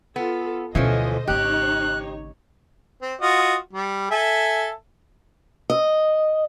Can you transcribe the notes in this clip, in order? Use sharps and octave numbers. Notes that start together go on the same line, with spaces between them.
B3 F4 A4
D2 B2 E3 F3 C#4 A4 C5 D#5
G#1 C#3 D#4 G4 C#5 F#6
C4
F4 F#4 D#5
G3
A4 E5 G#5
D#5